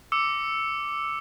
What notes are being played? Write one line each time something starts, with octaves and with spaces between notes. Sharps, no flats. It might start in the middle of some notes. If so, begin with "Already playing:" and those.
D6 E6 C#7